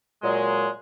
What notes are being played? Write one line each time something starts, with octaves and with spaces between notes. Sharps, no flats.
A#2 F#3 G#3